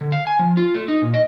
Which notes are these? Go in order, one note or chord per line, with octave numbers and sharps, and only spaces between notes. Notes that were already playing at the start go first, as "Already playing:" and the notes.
D3
F5
G#5
F3
F4
A3
D#4
A#2
D#5